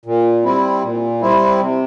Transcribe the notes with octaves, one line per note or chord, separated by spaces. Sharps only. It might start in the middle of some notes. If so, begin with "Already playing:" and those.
A#2
G3 C4 E4
A#2
G3 C4 E4
C3